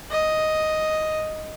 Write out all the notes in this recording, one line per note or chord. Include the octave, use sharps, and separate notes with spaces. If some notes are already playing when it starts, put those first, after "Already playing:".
D#5